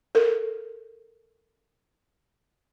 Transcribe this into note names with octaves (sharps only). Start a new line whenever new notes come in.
A4 A#4